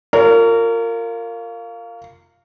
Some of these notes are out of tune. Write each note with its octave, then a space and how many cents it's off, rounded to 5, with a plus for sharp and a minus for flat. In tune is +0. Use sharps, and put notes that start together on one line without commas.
F4 +0 A#4 -25 C#5 +35